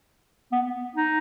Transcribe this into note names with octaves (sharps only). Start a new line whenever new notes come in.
B3
D#4